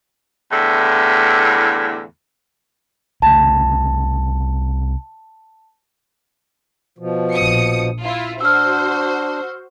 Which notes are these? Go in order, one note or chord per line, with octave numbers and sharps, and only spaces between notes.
E2 A2 D3
C2 C#3 A3 A5
B2 F3
A#1 D#6 C#7
E4 F4
D4 F#4 C5 E6 F6